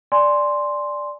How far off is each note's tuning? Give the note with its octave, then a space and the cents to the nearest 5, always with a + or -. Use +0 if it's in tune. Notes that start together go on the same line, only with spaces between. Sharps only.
D5 +0 G#5 +0 C6 +0